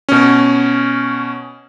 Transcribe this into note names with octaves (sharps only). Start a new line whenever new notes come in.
B2 C#4